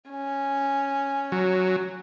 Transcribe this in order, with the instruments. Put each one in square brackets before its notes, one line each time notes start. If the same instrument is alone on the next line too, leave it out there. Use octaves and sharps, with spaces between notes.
[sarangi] C#4
[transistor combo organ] F#3